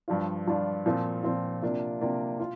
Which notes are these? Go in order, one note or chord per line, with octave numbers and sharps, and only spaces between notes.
G2 F3 D4 F4
G2 F3 D4 F4
A#2 F3 C4 F4
A#2 F3 C4 F4
C3 A#3 D4 F4
C3 A#3 D4 F4
F4